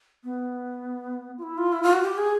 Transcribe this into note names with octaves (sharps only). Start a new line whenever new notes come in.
B3
F4
E4
F4
E4
F4
F#4
G4
G#4